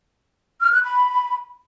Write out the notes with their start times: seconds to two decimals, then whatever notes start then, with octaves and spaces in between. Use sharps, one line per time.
0.61 F6
0.72 F#6
0.84 B5